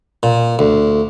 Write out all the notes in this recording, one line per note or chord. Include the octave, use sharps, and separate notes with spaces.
A#2
D2